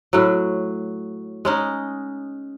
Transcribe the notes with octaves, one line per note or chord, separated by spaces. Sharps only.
A2 F#3
G#3 C#4 D#4